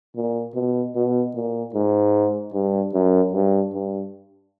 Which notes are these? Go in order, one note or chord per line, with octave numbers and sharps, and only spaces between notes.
A#2
B2
B2
A#2
G#2
G2
F#2
G2
G2